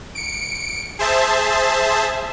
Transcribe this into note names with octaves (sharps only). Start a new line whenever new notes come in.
C#7 D7
G#4 C5 E5 A5